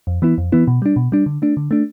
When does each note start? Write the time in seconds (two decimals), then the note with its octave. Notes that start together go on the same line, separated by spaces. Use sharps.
0.07 F2
0.22 E3 B3 E4
0.38 F2
0.52 E3 B3 E4
0.67 B2
0.82 G3 D4
0.96 B2
1.12 G3 D4
1.26 D3
1.42 A3 D4
1.57 D3
1.71 A3 D4